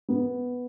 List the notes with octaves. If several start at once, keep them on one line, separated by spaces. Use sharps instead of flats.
B3